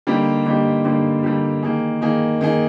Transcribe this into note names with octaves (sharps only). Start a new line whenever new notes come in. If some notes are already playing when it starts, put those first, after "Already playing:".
D3 G3 A#3 D#4 G4
D3 G3 A#3 D#4 G4
D3 G3 A#3 D#4 G4
D3 G3 A#3 D#4 G4
D#3 A#3 D#4 G#4
D#3 A#3 D#4 G#4
D#3 A#3 D#4 G#4